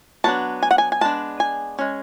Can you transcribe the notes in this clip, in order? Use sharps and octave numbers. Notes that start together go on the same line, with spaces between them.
F#3 B3 D4 A5
G#5
F#5
G#5
G#5
G#3 B3 D4 A5
G#5
G#3 C#4